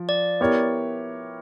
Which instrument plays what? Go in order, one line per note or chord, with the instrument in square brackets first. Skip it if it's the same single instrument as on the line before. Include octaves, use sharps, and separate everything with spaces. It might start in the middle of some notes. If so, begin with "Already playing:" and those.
Already playing: [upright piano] F3
[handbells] D5
[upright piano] B3 E4 G4 A#4 C#5